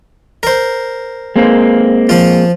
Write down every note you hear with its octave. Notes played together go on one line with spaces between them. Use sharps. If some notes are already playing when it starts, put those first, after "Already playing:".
A#4 C5
G#3 A#3 C4
F3 F4